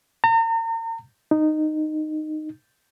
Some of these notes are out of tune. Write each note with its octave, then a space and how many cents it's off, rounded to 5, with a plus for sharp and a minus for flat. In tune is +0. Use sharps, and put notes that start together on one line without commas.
A#5 -40
D#4 -15